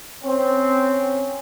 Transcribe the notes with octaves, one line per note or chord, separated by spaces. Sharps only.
C4 C#4